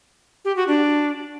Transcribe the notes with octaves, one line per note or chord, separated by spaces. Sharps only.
G4
F#4
D4